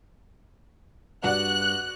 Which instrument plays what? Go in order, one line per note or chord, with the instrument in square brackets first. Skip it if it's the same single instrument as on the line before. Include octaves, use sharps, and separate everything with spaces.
[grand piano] G2 [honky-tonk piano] F#4 D5 F#5 [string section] F#6